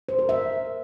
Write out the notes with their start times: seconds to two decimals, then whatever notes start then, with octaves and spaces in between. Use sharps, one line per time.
0.09 C5
0.19 A#4
0.29 E5